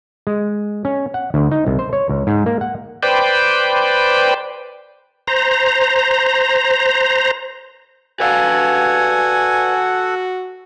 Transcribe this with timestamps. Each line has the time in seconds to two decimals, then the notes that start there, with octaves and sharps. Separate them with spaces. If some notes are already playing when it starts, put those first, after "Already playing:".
0.27 G#3
0.85 C#4
1.14 F#5
1.34 D2
1.52 D#4
1.66 C2
1.79 C5
1.93 C#5
2.09 C#2
2.27 G#2
2.46 A#3
2.61 F#5
3.03 B4 C5 D5 G5
5.27 C5 A#5
8.20 F#4 A4 B4 D5 F5 F#5 G#5